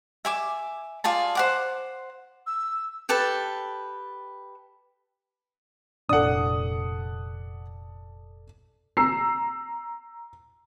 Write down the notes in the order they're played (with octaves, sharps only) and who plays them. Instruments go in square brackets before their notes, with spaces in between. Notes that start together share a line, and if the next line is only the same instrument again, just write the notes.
[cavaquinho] E5 G#5 D6
F4 G#4 D5 A5
C5 F#5 D6
[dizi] E6
[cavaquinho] G4 A4 B4 A5
[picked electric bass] F1 A#2 D4 [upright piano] A4 D5 [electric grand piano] F#5 D#6
[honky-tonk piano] A#5 E6 C7